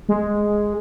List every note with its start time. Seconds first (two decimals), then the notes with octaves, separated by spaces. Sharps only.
0.09 G#3